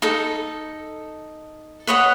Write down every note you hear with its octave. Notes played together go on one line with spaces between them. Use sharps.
D#4 A4
B4 C#5 D#5 F#5